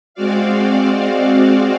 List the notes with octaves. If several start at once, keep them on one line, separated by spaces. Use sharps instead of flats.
G#3 C4 F#4 D5 F5